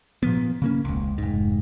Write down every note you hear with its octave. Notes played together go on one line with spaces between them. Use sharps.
A#2 F3 B3
C#3 A#3 C#4
E1 C#2
F1 G#2